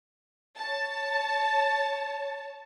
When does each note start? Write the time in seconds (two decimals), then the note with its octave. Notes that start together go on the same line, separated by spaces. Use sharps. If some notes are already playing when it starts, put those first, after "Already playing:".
0.56 C#5 A5